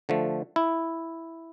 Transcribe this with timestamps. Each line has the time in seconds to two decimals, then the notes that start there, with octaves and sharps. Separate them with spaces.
0.09 D3 F3 A3
0.56 E4